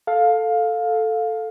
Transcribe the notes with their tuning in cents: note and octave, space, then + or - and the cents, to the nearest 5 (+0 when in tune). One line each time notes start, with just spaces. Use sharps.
A4 +0 F5 +15